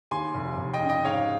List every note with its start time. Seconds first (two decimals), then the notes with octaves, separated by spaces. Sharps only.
0.11 D#2 G#5 C6
0.34 F1
0.58 F1
0.74 D#5 G5
0.82 C#3
0.89 D#5 G5
1.05 G#2 C#5 F5